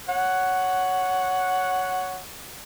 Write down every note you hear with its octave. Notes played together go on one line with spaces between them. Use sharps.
C#5 F#5